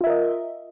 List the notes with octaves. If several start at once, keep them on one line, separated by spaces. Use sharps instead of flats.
F4 A#4 D#5 E5